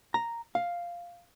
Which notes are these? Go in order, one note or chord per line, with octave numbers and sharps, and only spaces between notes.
A#5
F5